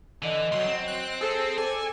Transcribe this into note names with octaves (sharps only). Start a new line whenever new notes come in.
D3 E3 D#5
C#2 F#2 F#3 C6
C4
F#6
G#4 A4 C5
A4 D5 G#5